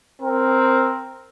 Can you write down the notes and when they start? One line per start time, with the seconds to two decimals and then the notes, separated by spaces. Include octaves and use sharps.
0.23 C4 A#4